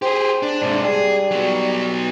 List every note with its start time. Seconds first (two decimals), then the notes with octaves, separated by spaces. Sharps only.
0.02 G4 G#4 C5
0.43 D4
0.62 G#2 C3 D4
0.85 G3 G#4
1.31 F#3 B3